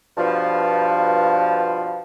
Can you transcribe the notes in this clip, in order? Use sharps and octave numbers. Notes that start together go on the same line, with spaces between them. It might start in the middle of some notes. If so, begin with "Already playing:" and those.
G2 B2 F3